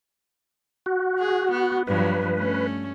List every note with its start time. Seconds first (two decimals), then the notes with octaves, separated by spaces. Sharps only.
0.86 F#4
1.19 G#4
1.51 B3
1.87 G2 F3 F#3 B4
2.35 A3 C#4